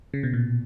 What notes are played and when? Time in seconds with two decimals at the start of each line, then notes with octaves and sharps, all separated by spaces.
0.14 C#3
0.23 B2
0.34 A#2